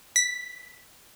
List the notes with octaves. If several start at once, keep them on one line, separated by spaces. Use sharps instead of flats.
B6